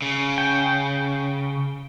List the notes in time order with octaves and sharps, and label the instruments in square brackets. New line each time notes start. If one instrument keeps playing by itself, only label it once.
[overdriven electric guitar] C#3
[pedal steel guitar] G5